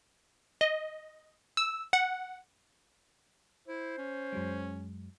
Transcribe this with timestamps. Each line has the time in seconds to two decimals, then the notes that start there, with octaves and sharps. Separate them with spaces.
0.61 D#5
1.57 E6
1.93 F#5
3.68 E4 C5
3.98 C#4
4.33 F#2 F#3 G#3